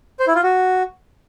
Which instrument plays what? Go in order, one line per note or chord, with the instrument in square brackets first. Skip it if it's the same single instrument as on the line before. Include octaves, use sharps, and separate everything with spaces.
[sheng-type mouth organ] C5
E4
F4
F#4